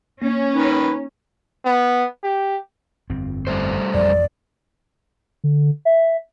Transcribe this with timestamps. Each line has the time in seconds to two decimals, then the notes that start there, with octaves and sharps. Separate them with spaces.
0.22 A#3 C#4
0.55 D#3 D#4 B4 A#5
1.66 B3
2.24 G4
3.10 G1 F2 C4
3.47 G3 A3 C5
3.94 A1 F2 D5
5.44 D3
5.85 E5